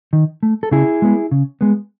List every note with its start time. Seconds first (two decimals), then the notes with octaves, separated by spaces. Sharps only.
0.13 D#3
0.43 A3
0.63 A4
0.71 C#3 E4 G#4
1.02 G#3 B3
1.31 C#3
1.61 G#3 B3